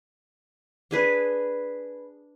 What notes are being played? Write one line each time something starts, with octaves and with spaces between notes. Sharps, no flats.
D4 G#4 B4